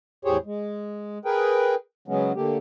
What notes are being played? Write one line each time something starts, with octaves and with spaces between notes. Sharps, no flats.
E2 A2 G4 G#4 C5 C#5
G#3
G#4 A#4 B4 G5
C#3 F#3 G#3 B3 C#4
D3 A3 A#3 G4